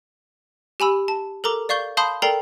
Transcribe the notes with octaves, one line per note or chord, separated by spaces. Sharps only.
G4 G#5 B5 E6
A5
A4 A#4 A#5 D6
D5 F5 C#6 G6 G7
F5 A5 B5 C6 D#6 G6
A4 A#4 D5 G5 A#5 C7